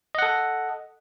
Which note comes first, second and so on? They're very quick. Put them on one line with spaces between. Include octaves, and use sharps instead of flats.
D#5 F#5 A4